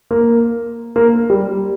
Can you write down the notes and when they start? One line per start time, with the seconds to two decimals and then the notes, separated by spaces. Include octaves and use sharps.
0.11 A#3
0.96 A#3
1.30 G3